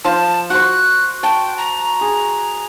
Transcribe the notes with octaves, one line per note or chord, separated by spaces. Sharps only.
F3 F4 A5
F#4 C5 F#6
G5 A5
A#5
G#4